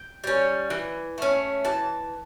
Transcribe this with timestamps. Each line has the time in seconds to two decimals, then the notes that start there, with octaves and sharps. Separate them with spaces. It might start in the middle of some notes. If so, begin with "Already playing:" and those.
Already playing: G5
0.24 G3 C#4
0.70 E3
1.18 A3 C#4
1.65 E3 A5